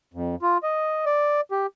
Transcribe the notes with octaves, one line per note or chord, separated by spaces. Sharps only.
F2
F4
D#5
D5
G4